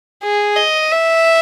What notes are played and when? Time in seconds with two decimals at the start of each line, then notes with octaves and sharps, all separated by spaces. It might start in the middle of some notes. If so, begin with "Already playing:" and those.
0.23 G#4
0.56 D#5
0.92 E5